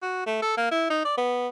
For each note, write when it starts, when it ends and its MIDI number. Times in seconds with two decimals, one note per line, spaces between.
0.02 0.23 66
0.26 0.37 57
0.42 0.56 69
0.57 0.69 58
0.71 0.85 64
0.90 1.02 63
1.05 1.13 74
1.18 1.48 59